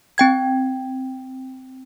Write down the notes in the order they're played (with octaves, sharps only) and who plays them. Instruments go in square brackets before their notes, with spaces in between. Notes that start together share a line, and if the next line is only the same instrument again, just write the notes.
[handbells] C4 G5 G#6